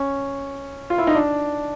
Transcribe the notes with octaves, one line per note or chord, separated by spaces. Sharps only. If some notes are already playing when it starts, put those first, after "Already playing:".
Already playing: C#4
F4
E4
D#4
D4